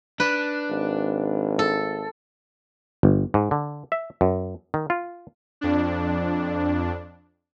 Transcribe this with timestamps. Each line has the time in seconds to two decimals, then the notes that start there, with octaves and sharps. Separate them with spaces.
0.20 D4 B4
0.70 G#1
1.59 A4
3.03 G1
3.34 G#2
3.51 D3
3.92 E5
4.21 F#2
4.74 D#3
4.90 F4
5.61 F2 D4